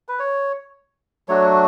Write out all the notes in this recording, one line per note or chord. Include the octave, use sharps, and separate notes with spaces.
B4
C#5
F#3 A3 D4 F#4 C#5